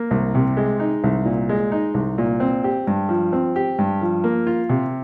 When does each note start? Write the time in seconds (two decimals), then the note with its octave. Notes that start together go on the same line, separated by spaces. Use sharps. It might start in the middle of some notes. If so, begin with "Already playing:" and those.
Already playing: A#3
0.11 C2
0.35 C3
0.57 G#3
0.80 D#4
1.04 C2
1.25 A#2
1.49 G#3
1.72 D#4
1.94 C2
2.18 A#2
2.40 C4
2.64 G4
2.87 G2
3.09 F3
3.33 C4
3.56 G4
3.78 G2
4.01 F3
4.24 A#3
4.47 F4
4.69 C3